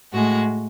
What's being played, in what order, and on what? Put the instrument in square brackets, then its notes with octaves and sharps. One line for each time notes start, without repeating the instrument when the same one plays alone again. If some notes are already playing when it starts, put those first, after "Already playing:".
[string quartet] A2 G#3 F#4